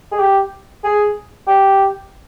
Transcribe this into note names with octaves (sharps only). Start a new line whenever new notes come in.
G#4
G4
G#4
G4